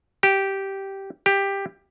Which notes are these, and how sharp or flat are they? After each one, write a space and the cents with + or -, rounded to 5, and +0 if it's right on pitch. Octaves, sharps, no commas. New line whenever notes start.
G4 -10
G4 +10